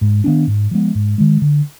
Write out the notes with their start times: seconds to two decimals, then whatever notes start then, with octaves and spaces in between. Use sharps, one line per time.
0.01 G#2
0.24 D#3 B3 D4
0.47 G#2
0.71 F3 G#3 B3
0.95 G#2
1.18 D#3 G#3
1.41 D3